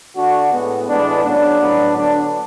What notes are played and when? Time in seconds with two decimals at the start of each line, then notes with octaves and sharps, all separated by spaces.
0.15 D3 A3 D4 F#4
0.52 A2 G#3 B3
0.88 A2 E3 G#3 B3 D4
1.23 C#3 F#3 B3 D4
1.60 A2 F#3 B3
1.96 D3 F#3 B3 D4